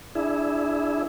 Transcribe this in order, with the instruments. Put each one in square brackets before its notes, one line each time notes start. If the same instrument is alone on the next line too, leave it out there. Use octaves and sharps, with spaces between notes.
[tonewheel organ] D4 E4 G#4 E5